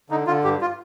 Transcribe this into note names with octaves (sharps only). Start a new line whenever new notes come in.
D3 D#4
D3 F4
G2 G4
F4